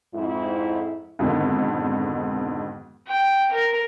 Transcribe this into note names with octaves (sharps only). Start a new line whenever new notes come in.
F2 G#2 E4
F2 G#2 B2 D3 D#3
G5
A#4